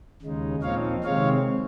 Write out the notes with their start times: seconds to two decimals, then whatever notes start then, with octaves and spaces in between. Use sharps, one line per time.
0.22 D#2 C#3 G#3 D#4
0.62 A#2 F3 C4 D#4 C#5 F5
1.03 C3 D#3 G#3 C4 C#5 F5